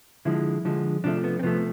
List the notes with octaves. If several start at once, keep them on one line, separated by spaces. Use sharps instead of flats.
D3 F3 G#3 E4
D3 F3 G#3
C3 F3 A3 D4
B3
C4
C3 F3 A3 B3